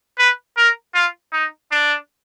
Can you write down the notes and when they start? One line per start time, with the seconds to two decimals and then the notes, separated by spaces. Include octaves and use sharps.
0.18 B4
0.57 A#4
0.94 F4
1.33 D#4
1.71 D4